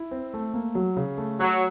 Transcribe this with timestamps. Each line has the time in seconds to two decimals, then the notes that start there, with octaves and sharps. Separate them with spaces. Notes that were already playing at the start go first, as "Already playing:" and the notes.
Already playing: E4
0.11 C4
0.34 A3
0.54 A#3
0.75 F#3
0.97 C#3
1.18 A3
1.39 F#3 F#4